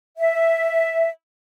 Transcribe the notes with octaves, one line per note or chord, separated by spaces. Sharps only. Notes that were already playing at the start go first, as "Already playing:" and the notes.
E5